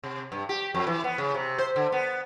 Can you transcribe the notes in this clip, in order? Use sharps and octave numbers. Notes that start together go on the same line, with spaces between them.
C3
G2
G4
F2
E3
B3
C#3
C3
C5
D3
B3